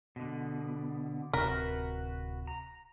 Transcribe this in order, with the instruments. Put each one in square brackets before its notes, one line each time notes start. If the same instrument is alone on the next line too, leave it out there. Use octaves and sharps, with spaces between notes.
[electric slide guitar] B2 D3
[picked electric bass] D1 C3 [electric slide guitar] F#4 B4 [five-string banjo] A#4
[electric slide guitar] A#5